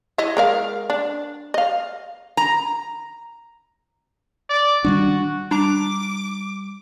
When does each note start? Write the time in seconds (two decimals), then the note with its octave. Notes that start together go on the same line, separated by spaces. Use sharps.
0.18 E4 C#5 D#5
0.37 G#3 A#4 F5
0.90 D4
1.54 D#5 F5
2.37 A#5
4.50 D5
4.85 D#3 G3 D4 F#4
5.51 G3 D4 A#5 D6